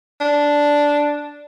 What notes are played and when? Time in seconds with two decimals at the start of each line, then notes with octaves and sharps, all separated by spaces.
0.21 D4